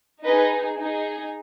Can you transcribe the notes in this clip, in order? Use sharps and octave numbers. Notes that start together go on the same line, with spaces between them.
D#4 G#4 B4 D#5
D#4 G#4